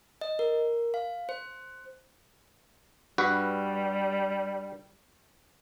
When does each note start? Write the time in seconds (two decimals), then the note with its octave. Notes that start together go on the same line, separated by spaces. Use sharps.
0.21 D#5
0.39 A#4
0.94 F5
1.29 C5
3.18 G2 G3 F#4 B4